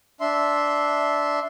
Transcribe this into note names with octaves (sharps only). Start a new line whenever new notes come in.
D4 E5 C6